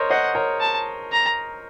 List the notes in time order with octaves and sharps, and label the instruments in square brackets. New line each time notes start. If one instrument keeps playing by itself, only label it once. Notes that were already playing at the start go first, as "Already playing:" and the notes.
Already playing: [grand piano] A#4 C5 C#5 D#5
[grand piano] C5 D#5 [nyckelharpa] F#5
[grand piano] A#4 C#5
[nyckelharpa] A5
A#5